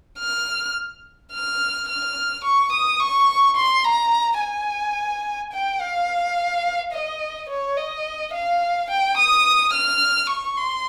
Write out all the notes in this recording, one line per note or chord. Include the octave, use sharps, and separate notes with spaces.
F6
F6
F6
C#6
D#6
C#6
C6
A#5
G#5
G5
F5
D#5
C#5
D#5
F5
G5
D#6
F6
C#6
C6